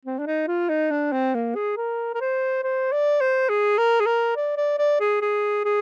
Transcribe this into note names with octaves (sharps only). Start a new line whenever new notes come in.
C4
D4
D#4
F4
D#4
D4
C4
A#3
G#4
A#4
A#4
C5
C5
D5
C5
G#4
A#4
G#4
A#4
D5
D5
D5
G#4
G#4
G#4